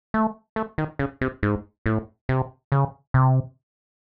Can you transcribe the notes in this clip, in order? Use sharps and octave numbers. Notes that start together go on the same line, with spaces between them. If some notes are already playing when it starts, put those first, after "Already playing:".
A3
A3
D#3
C#3
C3
G#2
A2
C3
C#3
C3